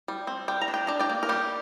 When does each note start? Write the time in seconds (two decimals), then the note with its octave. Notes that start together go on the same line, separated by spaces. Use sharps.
0.08 G3
0.27 C4
0.48 G3 G5
0.62 A#5
0.68 D4
0.74 G5
0.87 D4 A#5
0.99 D5 G5
1.10 A#3
1.23 A#4
1.29 G3 G4